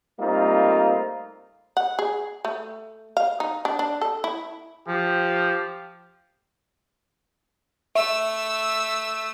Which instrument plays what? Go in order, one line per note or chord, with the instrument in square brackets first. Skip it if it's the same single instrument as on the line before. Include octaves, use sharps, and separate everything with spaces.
[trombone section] G3 A3 A#3 C4 D#4 F4
[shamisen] F#5
G#4
A3
F5
D#4
D4
D4
A4
E4
[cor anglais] F3 [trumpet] G4
[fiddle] A3 E6 [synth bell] E5